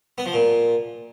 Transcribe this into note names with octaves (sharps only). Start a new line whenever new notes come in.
B3
F3
A#2